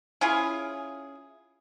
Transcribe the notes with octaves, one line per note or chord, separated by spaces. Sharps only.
C#4 E4 F4 G#4